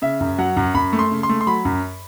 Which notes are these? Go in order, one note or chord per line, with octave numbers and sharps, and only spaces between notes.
C#3 E5
F#2
F#3 F#5
F#2
F#2 B5
A3
C6
C#3
C6
A3
C6
F#3 B5
F#2